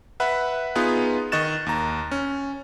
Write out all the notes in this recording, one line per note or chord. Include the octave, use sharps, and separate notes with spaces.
B4 E5 F#5 B5
B3 D#4 F4 G#4 B4
D#3 D#5 C#6 F#6 A6 E7
D#2 A#5
C#4